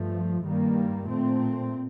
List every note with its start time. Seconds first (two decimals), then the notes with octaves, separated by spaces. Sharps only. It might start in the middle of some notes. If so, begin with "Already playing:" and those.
Already playing: G2 F3 A3
0.44 G2 D#3 G3 A#3
1.08 A#2 A3 C4